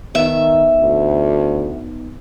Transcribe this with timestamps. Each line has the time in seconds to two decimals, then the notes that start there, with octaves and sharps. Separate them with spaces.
0.15 D#3 B3 D#4 E5
0.81 D2